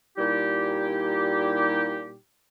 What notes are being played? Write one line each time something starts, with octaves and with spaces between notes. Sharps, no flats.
A#2 G3 D#4 E4 G4